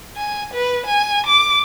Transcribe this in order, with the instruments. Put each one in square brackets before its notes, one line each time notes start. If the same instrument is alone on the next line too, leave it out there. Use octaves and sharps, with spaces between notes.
[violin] G#5
B4
G#5
D6